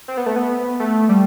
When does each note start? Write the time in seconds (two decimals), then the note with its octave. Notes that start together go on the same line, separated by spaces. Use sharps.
0.08 C4
0.17 B3
0.26 A3
0.36 B3
0.80 A3
1.09 G3